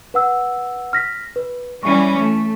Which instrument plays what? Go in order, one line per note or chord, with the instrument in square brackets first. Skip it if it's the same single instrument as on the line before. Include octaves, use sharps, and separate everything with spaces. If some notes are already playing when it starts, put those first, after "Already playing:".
[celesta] B4 F#5 E6
F6 A#6 B6
B4
[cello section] E3 G3 C#4 [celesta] C#6
[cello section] A3